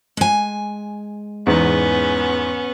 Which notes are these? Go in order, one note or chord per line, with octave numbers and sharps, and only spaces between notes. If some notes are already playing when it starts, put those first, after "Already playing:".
G#3 G#5
E2 G#2 B3 C#4